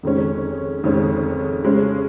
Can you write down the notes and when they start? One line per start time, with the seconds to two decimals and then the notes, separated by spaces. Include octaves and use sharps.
0.03 F2 D#3 G#3 C#4
0.84 F2 D#3 G#3 C#4
1.64 C#3 G#3 C#4